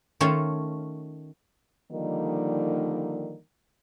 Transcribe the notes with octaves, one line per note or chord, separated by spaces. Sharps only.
D#3 A3 C#4 F4 C#5
D3 D#3 F3 G3 A#3 D#4